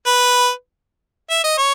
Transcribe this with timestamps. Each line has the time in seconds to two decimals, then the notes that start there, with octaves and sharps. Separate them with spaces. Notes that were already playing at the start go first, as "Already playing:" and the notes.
0.07 B4
1.30 E5
1.44 D#5
1.58 C#5